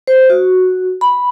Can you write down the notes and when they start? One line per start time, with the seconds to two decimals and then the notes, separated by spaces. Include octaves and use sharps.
0.08 C5
0.30 F#4
1.01 B5